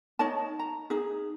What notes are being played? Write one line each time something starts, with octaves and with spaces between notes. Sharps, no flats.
D#4 C#5 D#5 A5
A#5
D#4 G#4